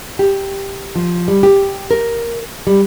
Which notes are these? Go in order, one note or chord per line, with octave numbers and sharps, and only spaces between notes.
G4
F3
G3
G4
A#4
G3